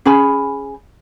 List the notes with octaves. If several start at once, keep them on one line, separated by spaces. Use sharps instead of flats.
C#4 G#4 G#5 B5